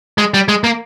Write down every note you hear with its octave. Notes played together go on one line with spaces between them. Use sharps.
G#3
G3
G#3
A#3